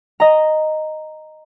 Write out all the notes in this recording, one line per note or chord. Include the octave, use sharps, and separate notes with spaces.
D#5 A#5